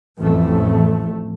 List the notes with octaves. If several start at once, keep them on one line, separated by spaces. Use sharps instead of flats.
A1 F2 A2 A3